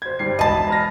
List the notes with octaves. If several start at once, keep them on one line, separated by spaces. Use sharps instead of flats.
C5 G#6
G2 G3 C7
E1 D#5 A5 B5
A#5 F6 A#6